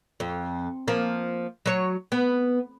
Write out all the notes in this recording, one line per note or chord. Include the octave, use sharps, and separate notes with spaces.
F2
F3 A#3
F#3 C#5
B3